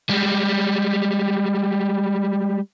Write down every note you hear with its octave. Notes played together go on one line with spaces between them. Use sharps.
G3 G#3